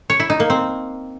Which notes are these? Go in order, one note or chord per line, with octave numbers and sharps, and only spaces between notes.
C#5
E4
D#4
A#3
C4